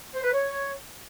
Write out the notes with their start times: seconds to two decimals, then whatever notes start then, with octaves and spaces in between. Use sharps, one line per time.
0.14 C5
0.24 B4
0.34 C#5